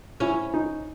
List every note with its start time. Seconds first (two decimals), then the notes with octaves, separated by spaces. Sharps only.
0.20 C#4 E4
0.54 D#4